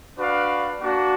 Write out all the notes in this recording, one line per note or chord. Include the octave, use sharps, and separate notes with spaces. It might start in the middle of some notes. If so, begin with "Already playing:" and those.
D4 F#4 B4 D5 F5
A#3 D4 F#4